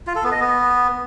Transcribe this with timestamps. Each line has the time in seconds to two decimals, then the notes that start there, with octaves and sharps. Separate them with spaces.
0.07 F4
0.15 A4
0.24 B3
0.32 D#5
0.40 B3